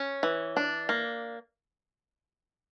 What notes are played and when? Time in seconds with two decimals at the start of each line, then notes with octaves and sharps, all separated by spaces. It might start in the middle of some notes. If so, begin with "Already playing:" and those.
Already playing: C#4
0.23 E3
0.57 D4
0.89 A#3